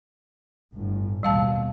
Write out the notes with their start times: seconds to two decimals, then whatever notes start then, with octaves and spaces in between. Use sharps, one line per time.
0.73 G1 A2
1.23 A#1 D#2 B2 G3 F5 A5